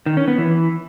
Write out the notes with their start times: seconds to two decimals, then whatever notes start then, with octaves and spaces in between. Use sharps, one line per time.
0.06 D#3
0.17 C#4
0.28 B3
0.38 E3